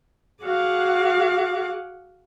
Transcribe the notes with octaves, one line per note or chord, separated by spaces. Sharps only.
F#4 G#4 F5 F#5 D6